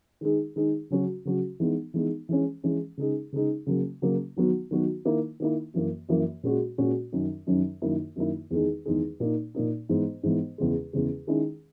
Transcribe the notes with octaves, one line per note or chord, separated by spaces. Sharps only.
D#3 G#3 D#4 G#4
D#3 G#3 D#4 G#4
C#3 F#3 C#4 F#4
C#3 F#3 C#4 F#4
E3 G#3 B3 D#4
E3 G#3 B3 D#4
E3 G#3 C#4
E3 G#3 C#4
C#3 G#3 D#4 G#4
C#3 G#3 D#4 G#4
C#3 F#3 A#3
C#3 F#3 A#3
D#3 F#3 B3 F#4
D#3 F#3 B3 F#4
D#3 A#3 E4
D#3 A#3 E4
F#2 E3 A#3
F#2 E3 A#3
A#2 G#3 C#4 F#4
A#2 G#3 C#4 F#4
F#2 D#3 F#3 C#4
F#2 D#3 F#3 C#4
F#2 D#3 A#3 E4
F#2 D#3 A#3 E4
E2 D#3 G#3 D#4 G#4
E2 D#3 G#3 D#4 G#4
A#2 A#3 D#4
A#2 A#3 D#4
G#2 E3 B3
G#2 E3 B3
E2 C#3 G#3
E2 C#3 G#3
D#3 G#3 C#4 E4 G#4